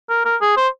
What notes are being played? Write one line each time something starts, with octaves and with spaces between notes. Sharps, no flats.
A#4
A#4
G#4
C5